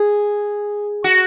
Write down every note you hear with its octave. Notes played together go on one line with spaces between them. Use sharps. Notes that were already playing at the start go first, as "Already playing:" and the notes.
Already playing: G#4
F#4